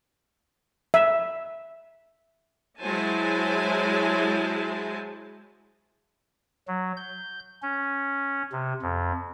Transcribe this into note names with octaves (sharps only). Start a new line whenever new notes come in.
E5
F#3 G#3 E4 C5 G#5 A5
F#3
G6
C#4
C3
F2